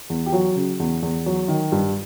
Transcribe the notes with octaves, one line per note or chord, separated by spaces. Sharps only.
E2
G4
F#3 F#4
C#3
E2
E2
F#3
D#3
G2